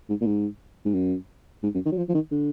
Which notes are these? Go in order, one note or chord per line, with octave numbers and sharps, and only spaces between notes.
G#2
A#2
G#2
G#2
F#2
G#2
F#2
D#3
F#3
F3
F3
D#3
D3